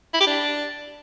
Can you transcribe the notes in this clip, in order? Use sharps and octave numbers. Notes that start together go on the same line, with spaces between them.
E4
G4
D4